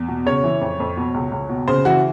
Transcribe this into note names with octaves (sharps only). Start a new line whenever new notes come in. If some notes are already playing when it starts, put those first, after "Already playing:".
Already playing: E2
B2
C#3 C#5
E3
F2
F2
B2
C#2
C#2
B2
C#3 C5
E3 F#4